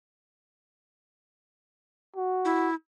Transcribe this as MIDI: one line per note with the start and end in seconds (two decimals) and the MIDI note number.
2.16 2.69 66
2.45 2.74 64